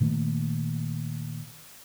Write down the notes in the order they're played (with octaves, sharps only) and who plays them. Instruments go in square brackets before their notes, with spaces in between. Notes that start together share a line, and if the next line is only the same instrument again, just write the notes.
[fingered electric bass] A#2 D#3 A3 A#3